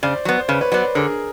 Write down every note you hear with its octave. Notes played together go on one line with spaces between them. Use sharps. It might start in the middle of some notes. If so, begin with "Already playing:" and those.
C#3 C5 D5
F#3 B3
C5
C#3 B4 C#5
B4 C#5
F#3 B3 C5 D5
D3 G#4 A#4